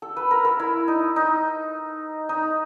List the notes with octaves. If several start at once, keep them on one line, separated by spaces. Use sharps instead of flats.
A4
B4
A#4
A4
E4
D#4
D#4
D#4